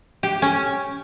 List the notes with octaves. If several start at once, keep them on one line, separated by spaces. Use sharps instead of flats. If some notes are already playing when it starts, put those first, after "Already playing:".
G4
C#4